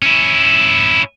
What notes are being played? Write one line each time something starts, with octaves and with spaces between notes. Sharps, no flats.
C#4 E4